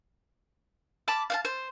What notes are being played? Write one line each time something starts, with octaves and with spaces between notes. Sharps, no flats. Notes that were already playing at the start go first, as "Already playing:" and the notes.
A5 B5 D6
F5 F#5 A5
C5